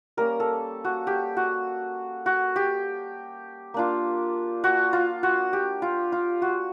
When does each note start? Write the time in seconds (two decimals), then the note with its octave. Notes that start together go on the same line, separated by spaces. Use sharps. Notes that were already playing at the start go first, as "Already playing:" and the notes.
0.17 G3 A#3 C#4 A#4
0.40 A4
0.84 F#4
1.07 G4
1.37 F#4
2.26 F#4
2.56 G4
3.74 A#3 D4 F4
4.64 F#4
4.93 F4
5.23 F#4
5.53 G4
5.82 F4
6.12 F4
6.42 F#4